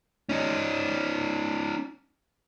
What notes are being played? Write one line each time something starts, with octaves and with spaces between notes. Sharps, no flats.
C#4 D#4